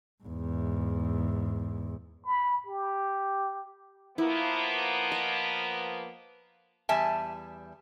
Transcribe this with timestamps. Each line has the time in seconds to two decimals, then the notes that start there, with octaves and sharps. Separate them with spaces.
0.24 E2 G#2
2.25 B5
2.67 G4
4.18 F3 A#3 B3 E4
5.12 D#5
6.89 E2 G3 E5 G#5 A5